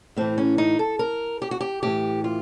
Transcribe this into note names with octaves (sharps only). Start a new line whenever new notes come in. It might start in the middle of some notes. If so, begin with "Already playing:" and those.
A2 E3 C4
C#4
D#4
A4
A#4
G4
F#4
G4
A2 E3 G4
F4